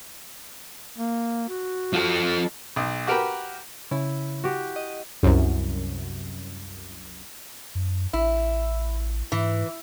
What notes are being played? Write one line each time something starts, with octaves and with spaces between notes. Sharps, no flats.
A#3
F#4
F3 A4
B1
F#4 G4 A#4 B4 G5
C#3 E4
F#4 G4
D#5
C2 F#2
F#2
A1 E4
G#2 E3